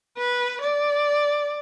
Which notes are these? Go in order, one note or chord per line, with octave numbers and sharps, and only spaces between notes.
B4
D5